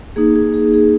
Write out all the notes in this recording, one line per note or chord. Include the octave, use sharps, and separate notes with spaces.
A#3 D#4 G#4
G#4
G#4
G#4